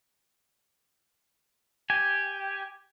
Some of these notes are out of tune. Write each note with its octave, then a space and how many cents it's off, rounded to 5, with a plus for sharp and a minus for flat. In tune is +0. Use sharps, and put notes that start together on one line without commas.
G4 +0 G#5 +0